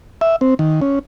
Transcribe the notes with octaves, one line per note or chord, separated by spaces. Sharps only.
E5
C4
D#3
C#4